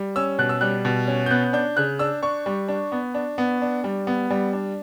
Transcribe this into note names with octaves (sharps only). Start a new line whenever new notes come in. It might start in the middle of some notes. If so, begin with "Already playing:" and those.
Already playing: G3
C#4 E6
B2 F#6
E6
G3 F#6
B2
C#4
G6
B3 F#6
D4 G6
C#3 F#6
D4 E6
D4 C#6
G3
D4
B3
D4
B3
D4
G3
B3
G3
D4